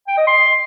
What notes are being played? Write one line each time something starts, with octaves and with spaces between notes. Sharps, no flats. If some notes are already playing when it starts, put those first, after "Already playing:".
G5
D#5
C6